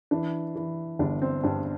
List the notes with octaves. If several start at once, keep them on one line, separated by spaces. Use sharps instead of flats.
E3 D4
E3
G1 D4
C4
G2 D4